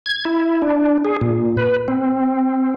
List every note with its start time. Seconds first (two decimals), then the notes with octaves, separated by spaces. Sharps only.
0.06 G#6
0.25 E4
0.62 D4
1.05 G#4
1.21 A#2
1.57 B4
1.88 C4